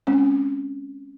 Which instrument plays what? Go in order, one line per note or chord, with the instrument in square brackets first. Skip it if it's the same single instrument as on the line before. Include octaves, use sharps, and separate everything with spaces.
[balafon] G#3 C4 C#4